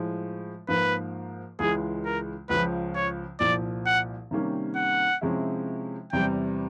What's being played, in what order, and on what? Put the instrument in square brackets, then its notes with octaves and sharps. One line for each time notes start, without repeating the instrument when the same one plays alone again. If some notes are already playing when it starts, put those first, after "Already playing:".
Already playing: [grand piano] A2 F3 G#3
[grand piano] G#2 F3 A#3 [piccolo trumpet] B4
[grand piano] C#2 C#3 E3 G#3 [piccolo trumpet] G#4
[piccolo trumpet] A#4
[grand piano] C#2 C#3 F3 [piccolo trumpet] B4
[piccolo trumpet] C#5
[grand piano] C2 A#2 F3 [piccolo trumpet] D5
[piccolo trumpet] F#5
[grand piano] C3 D#3 G3 A#3 C#4
[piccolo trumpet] F#5
[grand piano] C3 F3 G#3 C#4 E4
[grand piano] E2 C3 E3 G3 [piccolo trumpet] G5